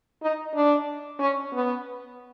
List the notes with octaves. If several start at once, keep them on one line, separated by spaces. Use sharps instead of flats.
D#4
D4
C#4
B3